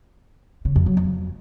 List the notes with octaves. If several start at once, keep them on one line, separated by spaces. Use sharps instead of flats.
C#3
F2
F#3
F2